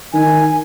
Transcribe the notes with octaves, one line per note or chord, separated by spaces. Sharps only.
D#3 G#5